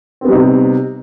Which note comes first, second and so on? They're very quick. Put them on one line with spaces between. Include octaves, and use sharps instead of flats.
C4 B3 G3 D#4 C3